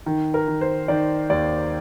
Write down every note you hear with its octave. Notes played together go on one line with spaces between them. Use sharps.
D#3
A#4
D#3
C5
D#3 D5
D#2 D5